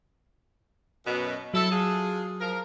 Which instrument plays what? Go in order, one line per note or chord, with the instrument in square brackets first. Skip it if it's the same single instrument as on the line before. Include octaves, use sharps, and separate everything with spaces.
[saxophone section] F#2 B2
[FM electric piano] F#3 [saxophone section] E4 A4
[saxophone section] D4 F4 G#4
F3 A#4